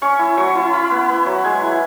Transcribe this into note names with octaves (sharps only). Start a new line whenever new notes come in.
C#4 C#6
E4
F#3 C#6
E4
E4 B5
B3
B3
F#3
G#3 G#5
E4